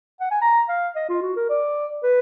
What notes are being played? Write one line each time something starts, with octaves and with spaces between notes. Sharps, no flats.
F#5
G#5
A#5
F5
D#5
F4
F#4
A#4
D5
B4